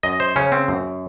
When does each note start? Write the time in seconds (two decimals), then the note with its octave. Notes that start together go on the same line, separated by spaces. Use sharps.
0.03 F#2 D#5
0.20 C5
0.36 C#3 C#4
0.52 C4
0.68 F#2